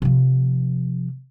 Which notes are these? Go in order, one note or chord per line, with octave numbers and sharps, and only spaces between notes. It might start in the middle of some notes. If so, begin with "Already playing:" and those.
C3 F3